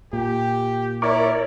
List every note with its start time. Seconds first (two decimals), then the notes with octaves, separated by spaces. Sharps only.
0.13 A#2 G4
1.02 E4 A#4 C#5 D5